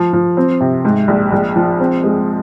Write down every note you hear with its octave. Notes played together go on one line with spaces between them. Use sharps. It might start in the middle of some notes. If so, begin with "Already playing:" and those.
Already playing: F3
F3
C4
C3
G#2
A#1
A#1
F3
C4
G#3